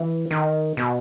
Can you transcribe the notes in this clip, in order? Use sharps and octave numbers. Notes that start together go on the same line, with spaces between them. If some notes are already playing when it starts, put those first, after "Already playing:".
Already playing: E3
D#3
B2